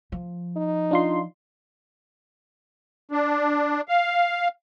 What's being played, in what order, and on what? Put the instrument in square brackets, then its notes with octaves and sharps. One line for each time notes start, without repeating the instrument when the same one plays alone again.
[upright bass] F3
[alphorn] D#4
[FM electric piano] D4 F4 C6
[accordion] D4
F5